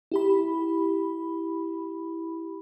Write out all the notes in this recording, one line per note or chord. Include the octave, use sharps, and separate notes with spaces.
E4 G4 B5